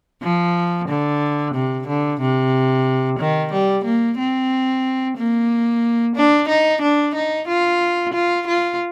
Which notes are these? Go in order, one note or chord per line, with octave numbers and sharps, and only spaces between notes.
F3
D3
C3
D3
C3
D#3
G3
A#3
C4
A#3
D4
D#4
D4
D#4
F4
F4
F4